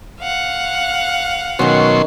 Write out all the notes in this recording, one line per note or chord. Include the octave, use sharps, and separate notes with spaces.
F5 F#5
B2 D#3 F#3 C#4 C6